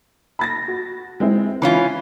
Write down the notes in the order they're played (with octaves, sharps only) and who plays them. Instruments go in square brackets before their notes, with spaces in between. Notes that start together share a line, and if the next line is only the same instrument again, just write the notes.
[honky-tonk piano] B5 A6 A#6
F#4
G#3 C4 E4
[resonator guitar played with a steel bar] E3 C#4 F4 [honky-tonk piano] B5